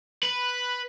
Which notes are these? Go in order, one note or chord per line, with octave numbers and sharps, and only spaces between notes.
B4